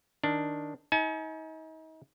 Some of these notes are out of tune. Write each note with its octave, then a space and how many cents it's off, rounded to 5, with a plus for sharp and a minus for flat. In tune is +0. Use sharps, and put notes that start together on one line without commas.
D#3 +0 D4 +0
D#4 +35 G#5 +40